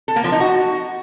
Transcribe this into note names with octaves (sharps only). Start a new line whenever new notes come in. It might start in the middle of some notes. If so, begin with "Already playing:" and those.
A4
A#3
F3
D#4
F#4